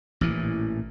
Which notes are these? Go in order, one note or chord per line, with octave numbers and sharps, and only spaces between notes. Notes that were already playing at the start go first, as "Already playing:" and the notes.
A1 A#2 E3